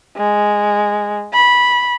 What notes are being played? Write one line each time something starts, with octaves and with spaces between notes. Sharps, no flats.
G#3
B5